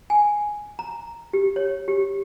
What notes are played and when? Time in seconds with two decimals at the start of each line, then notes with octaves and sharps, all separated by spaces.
0.10 G#5
0.79 A#5
1.33 G4
1.56 C#5
1.88 G4